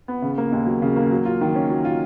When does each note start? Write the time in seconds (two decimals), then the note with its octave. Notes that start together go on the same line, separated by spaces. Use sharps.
0.08 B3
0.22 C#3
0.38 A#3
0.52 D#2
0.66 F#3
0.82 C#3
0.96 A#3
1.11 F#3
1.25 F4
1.41 D#3
1.55 C#4
1.70 F#3
1.85 F4